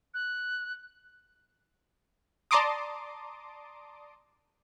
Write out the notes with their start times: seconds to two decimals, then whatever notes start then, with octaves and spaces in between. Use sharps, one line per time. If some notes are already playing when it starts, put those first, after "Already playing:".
0.14 F#6
2.51 D5 A5 A#5 C6 D6 D#6